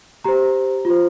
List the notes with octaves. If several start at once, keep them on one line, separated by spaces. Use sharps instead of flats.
G4 C5 A#5
F4
C5